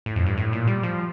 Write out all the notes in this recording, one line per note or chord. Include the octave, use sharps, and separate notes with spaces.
A2
F2
G2
A2
A#2
G3
F3